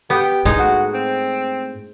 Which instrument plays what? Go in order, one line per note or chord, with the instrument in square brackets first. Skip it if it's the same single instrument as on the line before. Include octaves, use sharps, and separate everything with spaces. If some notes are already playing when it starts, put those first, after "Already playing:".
[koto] B3 [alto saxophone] G4
[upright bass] A2 [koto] G#3 D#4
[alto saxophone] F#4
C4